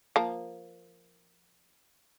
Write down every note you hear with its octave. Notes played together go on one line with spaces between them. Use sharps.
F3 A#3